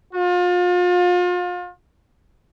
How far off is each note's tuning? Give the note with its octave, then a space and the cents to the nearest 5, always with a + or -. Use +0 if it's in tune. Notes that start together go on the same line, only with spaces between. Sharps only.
F4 +35